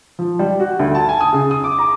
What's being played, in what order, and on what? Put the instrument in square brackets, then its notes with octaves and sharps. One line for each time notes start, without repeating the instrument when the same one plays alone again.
[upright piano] F3
G3
F#4
D2
A5
G#5
D#6
C#3
D#6
D6
A#5